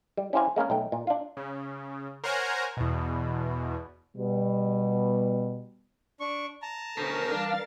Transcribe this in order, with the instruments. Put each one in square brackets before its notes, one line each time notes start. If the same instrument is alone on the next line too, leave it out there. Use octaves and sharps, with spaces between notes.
[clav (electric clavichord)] G3
C#4 E4 G4 C5 F5 G#5
G#3 A#3 C#4 A#4
B1 A3 G5
A#2
D4 F4
[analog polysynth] C#3
A#4 C5 C#5 F#5 G#5 A#5
E2 B2
[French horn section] B2 G3
[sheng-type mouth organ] D4 C#6
A5 A#5
[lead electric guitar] B2 C#4 [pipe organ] D3 D4 C5 [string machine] A#4
[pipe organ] E3 G3 [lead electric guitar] D4 [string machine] F5 F6 A6